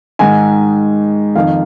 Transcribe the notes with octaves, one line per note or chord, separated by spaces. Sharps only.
G#2 D#3 G#5
F2 D#3 F5